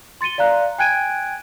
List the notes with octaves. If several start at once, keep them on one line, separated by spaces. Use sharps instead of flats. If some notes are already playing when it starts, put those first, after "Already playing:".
C6 A6 C#7 D#7 G7
D5 F5 A#5 F#6
G5 G#5 F#6 G#6 D7 D#7